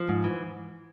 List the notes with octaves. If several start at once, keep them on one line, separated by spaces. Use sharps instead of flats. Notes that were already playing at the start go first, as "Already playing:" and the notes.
Already playing: F3
G#2
E3